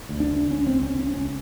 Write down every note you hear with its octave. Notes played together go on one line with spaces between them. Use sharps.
D2
D4
C#3
C#2 C#4
C4
C#2
C#4
C#2
C#4
C#2 C#4